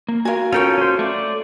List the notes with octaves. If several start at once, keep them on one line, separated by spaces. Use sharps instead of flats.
A#3
F#4 A#4 F5 G#5
C#4 F4 A4 A#4 C#5 G5
C#4 C5
A3 D5